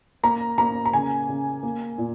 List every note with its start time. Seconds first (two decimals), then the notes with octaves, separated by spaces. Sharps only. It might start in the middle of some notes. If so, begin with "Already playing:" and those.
0.23 A#3 A#5
0.58 A#3 A#5
0.86 A#5
0.93 C#3 G#5
1.29 C#3
1.63 A#3
1.98 A#2